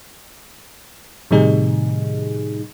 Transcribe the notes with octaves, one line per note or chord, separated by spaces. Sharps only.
A2 C3 D#3 G3 D#4 G#4